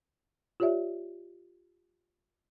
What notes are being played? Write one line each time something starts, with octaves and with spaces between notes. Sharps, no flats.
F4 G4 C#5 D5 E5